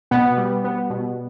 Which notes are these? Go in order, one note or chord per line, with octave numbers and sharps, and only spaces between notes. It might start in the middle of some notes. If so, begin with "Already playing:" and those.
B2 B3
G3
B3
B2